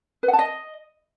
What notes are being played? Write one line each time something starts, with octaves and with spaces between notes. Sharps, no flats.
B4
F#5
A5
D#5